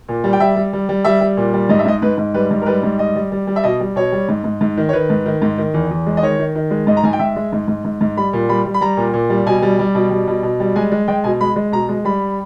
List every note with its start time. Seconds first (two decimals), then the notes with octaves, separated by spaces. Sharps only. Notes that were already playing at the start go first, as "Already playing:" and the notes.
0.09 A#2
0.24 G3
0.33 G5
0.40 G3 E5
0.56 G3
0.73 G3
0.89 G3
1.05 G3 E5
1.21 G3
1.37 A#2
1.54 G3
1.69 G#2 D#5
1.79 E5
1.85 G#2 D#5
2.02 G#2 B4
2.18 G#2
2.34 G3 B4
2.51 G#2
2.62 A#4
2.66 G3 B4
2.83 G#2
2.99 G3 D#5
3.15 G3
3.32 G3
3.47 G3
3.56 E5
3.64 B2 D#5
3.80 G3
3.96 B2 C#5
4.12 G3
4.29 G#2
4.44 G#2
4.61 G#2
4.77 D#3
4.89 C#5
4.93 D#3 B4
5.10 G#2
5.26 D#3
5.42 G#2
5.58 D#3
5.74 E2
5.91 E2
6.07 G#3
6.17 D#5
6.22 D#3 C#5
6.39 D#3
6.55 D#3
6.71 G#3
6.87 G#2 D#5
6.97 A#5
7.04 G#2 G#5
7.13 G5
7.19 G#2 E5
7.36 G#3
7.53 G#2
7.68 G#2
7.85 G#2
8.01 G#2
8.17 G3 B5
8.33 A#2
8.49 G3 B5
8.66 G3
8.74 B5
8.81 G3 A#5
8.97 A#2
9.14 A#2
9.30 G3
9.46 B2 G#5
9.62 G3
9.79 G3
9.95 B2
10.11 G3
10.27 B2
10.43 B2
10.60 G3
10.76 G#3 G#5
10.92 G#3
11.08 G#3 G5
11.24 B2 G#5
11.41 G#3 B5
11.56 G#3
11.72 B2 A#5
11.89 G#3
12.05 G3 B5